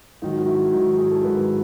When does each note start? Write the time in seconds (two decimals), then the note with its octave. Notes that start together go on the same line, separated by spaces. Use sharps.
0.22 G#2 D#3 F#3 D#4
0.39 F#4
0.47 E4
0.72 G#2 D#3 F#3 D#4
0.85 E4
0.98 G#4
1.11 A4
1.23 G#2 D#3 F#3 B4